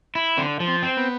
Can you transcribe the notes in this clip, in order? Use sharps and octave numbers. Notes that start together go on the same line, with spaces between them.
E4
D3 C4
F3
C4
C4
B3